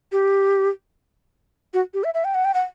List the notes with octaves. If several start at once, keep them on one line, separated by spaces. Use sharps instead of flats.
G4
F#4
G4
E5
E5
G5
F#5
G5
F#5